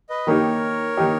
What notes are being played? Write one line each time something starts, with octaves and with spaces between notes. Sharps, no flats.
B4 D#5
D#3 A#3 D#4 G4 A#4 C#5
D#3 A#3 D#4 G4